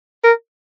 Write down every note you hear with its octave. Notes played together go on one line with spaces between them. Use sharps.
A#4